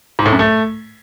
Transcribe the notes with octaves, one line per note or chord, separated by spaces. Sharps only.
G#2
A2
F#2
A3